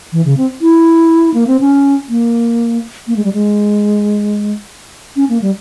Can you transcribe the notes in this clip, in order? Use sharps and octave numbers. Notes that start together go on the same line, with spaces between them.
E3
C#3
C4
E4
A#3
C4
C#4
A#3
A#3
G#3
G3
G#3
C#4
A#3
G3